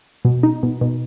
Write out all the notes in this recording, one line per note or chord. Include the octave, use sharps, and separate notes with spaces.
B2
D#4
B2
B2